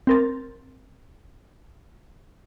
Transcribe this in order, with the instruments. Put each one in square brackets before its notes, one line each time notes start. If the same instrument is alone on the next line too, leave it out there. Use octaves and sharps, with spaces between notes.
[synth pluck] C4 A#4 A6